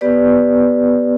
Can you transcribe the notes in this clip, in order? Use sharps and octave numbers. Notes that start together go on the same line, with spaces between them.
B3 G4 B4 D5